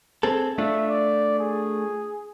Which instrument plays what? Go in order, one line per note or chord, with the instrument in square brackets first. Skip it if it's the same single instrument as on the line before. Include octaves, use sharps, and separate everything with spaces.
[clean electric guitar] C4 G#4 A4
[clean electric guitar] A3 D4 F4 [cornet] E5
[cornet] D5
G#4